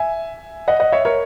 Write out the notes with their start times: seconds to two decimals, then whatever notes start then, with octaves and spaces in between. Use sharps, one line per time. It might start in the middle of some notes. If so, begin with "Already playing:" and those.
Already playing: E5 G#5
0.68 D#5 F#5
0.80 D#5 F#5
0.92 C#5 E5
1.05 A#4 C#5